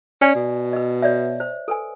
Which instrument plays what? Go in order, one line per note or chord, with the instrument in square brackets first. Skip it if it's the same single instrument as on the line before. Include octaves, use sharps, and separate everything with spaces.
[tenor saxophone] C#4 [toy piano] D5 G#5
[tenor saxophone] B2
[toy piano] B4 D#5
C#5 D5 E5
C5
A4 B4 G#5